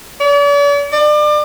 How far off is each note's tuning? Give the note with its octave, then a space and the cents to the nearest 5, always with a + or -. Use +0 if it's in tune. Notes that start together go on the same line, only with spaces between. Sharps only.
D5 -45
D5 +30